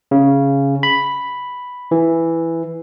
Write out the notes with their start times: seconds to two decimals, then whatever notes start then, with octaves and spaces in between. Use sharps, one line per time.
0.11 C#3
0.83 B5
1.91 E3